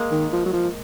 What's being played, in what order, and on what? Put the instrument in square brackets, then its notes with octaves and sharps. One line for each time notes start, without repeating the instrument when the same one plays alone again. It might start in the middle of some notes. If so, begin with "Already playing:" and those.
Already playing: [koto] G#3 A#3
[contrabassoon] D#3
F3
F#3
F3